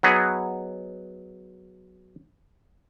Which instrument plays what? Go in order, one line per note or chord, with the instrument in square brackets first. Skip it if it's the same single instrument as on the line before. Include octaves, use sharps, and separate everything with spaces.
[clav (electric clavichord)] F#3 B3 D#4 G#4